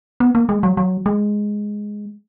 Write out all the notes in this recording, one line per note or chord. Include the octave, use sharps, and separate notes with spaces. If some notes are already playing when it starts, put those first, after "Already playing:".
B3
A#3
G#3
F#3
F#3
G#3